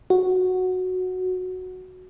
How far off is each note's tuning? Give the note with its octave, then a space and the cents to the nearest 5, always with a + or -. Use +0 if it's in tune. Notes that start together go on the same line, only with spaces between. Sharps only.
F#4 -5